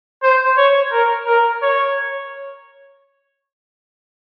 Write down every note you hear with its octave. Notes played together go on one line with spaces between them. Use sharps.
C5
C#5
A#4
A#4
C#5